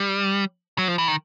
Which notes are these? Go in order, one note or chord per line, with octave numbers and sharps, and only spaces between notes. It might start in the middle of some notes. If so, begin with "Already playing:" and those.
Already playing: G3
F#3
F3
E3
D#3